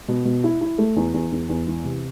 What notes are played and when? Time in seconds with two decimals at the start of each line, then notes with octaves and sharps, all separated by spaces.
0.08 B2
0.25 B2
0.44 E4
0.61 E4
0.78 A3
0.96 E2
1.14 E2
1.32 E2
1.49 E2
1.67 E3
1.84 C3